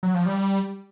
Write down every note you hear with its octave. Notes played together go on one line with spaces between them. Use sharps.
F#3
F3
G3